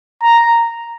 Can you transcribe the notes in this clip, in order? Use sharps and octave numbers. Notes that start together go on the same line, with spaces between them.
A#5